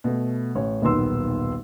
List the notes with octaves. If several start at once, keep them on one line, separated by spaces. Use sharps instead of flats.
B2 A3
A1 C#5
D#1 B1 D#3 B3 C6 E6